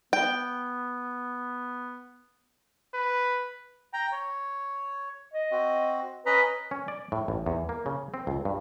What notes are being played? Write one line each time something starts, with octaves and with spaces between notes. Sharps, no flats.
B3 G5
B4
G5 A#5
C#5
D#5
C4 F#4
C#4 B4 D#5 A#5
C#4
D5
A2
A1
E2
A#3
C#3
C4
C#2
G2